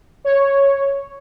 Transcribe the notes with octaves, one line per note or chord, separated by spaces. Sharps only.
C#5